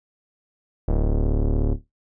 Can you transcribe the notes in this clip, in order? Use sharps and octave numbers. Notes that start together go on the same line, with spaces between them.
D1